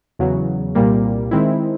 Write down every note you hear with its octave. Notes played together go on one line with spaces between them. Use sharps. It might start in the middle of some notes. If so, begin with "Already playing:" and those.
E2 C#3 F#3
C2 A#2 G3 A#3
D#3 G#3 C4 E4